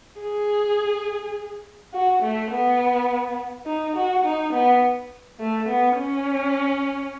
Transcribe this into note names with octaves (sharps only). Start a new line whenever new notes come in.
G#4
F#4
A3
B3
D#4
F#4
D#4
B3
A3
B3
C#4